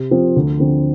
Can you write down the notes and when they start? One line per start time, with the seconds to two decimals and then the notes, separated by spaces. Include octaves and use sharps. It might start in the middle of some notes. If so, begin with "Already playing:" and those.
Already playing: C3
0.11 F3 C4 F4
0.36 D2
0.59 D3 F3 C4